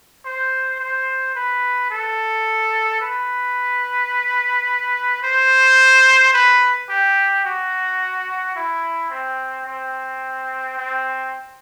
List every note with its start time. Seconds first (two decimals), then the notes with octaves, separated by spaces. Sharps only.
0.25 C5
0.80 C5
1.35 B4
1.91 A4
3.01 B4
5.23 C5
6.33 B4
6.89 G4
7.45 F#4
8.56 E4
9.10 C4
9.66 C4
10.77 C4